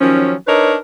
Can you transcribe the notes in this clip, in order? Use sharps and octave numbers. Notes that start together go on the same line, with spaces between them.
D#3 F3 F#3 C#4
D4 D#4 A#4 B4 C#5